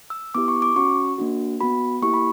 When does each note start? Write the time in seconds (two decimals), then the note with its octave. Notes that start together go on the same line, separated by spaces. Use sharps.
0.10 E6
0.35 B3 E4 G4 D6
0.48 C#6
0.62 D6
0.76 C#4 F#4 C#6
1.18 A#3 D4 F#4
1.61 B3 F#4 B5
2.02 A#3 E4 G4 C#6
2.14 B5